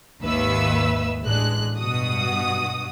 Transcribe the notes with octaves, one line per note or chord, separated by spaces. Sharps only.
G#1 D#2 D#3 B4 E5 E6
A1 G#3 D4 F#6
G2 B2 F#4 D#6